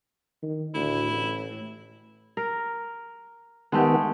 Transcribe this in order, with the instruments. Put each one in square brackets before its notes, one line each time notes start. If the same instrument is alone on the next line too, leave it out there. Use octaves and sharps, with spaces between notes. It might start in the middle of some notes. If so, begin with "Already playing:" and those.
[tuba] D#3
[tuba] D2 [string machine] A2 [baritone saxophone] E4
[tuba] A1
[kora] A#4
[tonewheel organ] D#3 B3 [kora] G#3 A3 G4